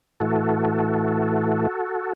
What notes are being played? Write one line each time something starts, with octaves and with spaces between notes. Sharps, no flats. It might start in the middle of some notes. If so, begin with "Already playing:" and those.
A2 E3 A3 F#4 A4